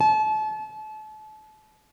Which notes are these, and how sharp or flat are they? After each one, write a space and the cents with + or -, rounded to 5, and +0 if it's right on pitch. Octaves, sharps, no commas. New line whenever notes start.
A5 -35